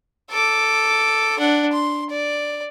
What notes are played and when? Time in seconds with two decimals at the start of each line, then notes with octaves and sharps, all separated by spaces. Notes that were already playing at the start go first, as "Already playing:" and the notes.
0.30 A4 D6
1.39 D4 F#5
1.73 C6
2.10 D5